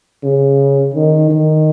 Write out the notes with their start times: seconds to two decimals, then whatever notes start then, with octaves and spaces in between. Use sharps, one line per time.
0.24 C#3
0.94 D#3
1.31 D#3